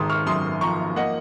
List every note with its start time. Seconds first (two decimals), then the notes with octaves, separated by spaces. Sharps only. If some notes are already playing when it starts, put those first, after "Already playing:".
Already playing: G#1 G#3 A#5 C6 D#6
0.10 C#6 F6
0.26 F#2 C6 D#6
0.61 F3 A#5 C#6
0.96 A#3 D#5 F#5